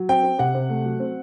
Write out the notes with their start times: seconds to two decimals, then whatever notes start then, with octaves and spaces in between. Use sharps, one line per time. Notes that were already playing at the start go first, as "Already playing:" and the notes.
Already playing: F#3
0.09 C4 G5
0.23 C4
0.39 C3 F#5
0.55 C3
0.69 A3
0.85 F#3
1.00 C4